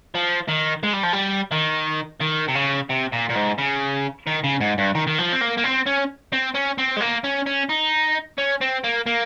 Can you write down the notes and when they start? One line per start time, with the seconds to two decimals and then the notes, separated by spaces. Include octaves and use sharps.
0.15 F3
0.48 D#3
0.83 G#3
0.93 G3
1.03 F3
1.13 G3
1.52 D#3
2.20 D#3
2.48 C3
2.55 C#3
2.89 C3
3.12 A#2
3.29 A#2
3.35 G#2
3.58 C#3
4.27 D#3
4.44 C#3
4.61 G#2
4.78 G2
4.95 D#3
5.07 D#3
5.18 F3
5.32 C4
5.41 A#3
5.57 A#3
5.64 C4
5.86 C#4
6.32 C4
6.54 C#4
6.78 C4
6.97 G#3
7.01 A#3
7.24 C#4
7.47 C#4
7.69 D#4
8.38 C#4
8.61 C4
8.84 A#3
9.06 A#3